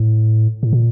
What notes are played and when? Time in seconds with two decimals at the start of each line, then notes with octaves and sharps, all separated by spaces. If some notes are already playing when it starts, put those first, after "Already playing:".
Already playing: A2
0.63 A2
0.73 A#2